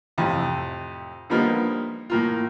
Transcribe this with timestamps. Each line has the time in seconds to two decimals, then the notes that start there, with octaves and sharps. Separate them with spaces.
0.18 F2 A2 C3
1.30 D3 F3 G3 A#3 B3 D#4
2.10 A2 A#3 F4